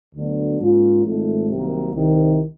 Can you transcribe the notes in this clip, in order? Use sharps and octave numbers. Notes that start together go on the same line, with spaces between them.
D2 D3 F#3 B3 D4
G#2 F3 A#3 C#4 F4
G#1 G#2 F3 A3
C2 C3 D#3 F#3 A#3
C2 C3 D#3